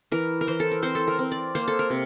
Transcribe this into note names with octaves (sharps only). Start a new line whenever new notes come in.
E3 A#4
A#4
E3 C5
A4
A#4
C4 C5
A4
A#4
C4
D5
A#3 C5
A4
A#4
C3